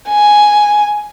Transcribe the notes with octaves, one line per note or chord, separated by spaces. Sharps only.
G#5